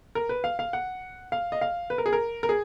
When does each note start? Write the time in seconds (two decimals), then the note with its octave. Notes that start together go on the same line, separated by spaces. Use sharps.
0.15 A#4
0.29 B4
0.44 F5
0.59 F5
0.73 F#5
1.32 F5
1.52 D#5
1.61 F5
1.90 B4
1.98 A#4
2.06 G#4
2.13 A#4
2.43 A#4
2.49 G#4